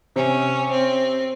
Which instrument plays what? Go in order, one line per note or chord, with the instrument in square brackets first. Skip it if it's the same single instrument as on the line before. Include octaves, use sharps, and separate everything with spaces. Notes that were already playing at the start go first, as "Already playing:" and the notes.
[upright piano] C3 [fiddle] C#4
[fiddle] C4